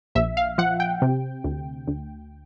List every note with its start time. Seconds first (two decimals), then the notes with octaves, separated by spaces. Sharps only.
0.15 A#1 E5
0.37 F5
0.58 F3 F#5
0.80 G5
1.02 C3
1.44 D2
1.87 D2